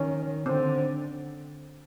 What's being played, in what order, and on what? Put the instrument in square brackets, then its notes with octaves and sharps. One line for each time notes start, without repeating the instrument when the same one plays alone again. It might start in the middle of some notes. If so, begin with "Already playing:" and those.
Already playing: [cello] D#3 [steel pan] C#4
[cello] D3 [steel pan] C4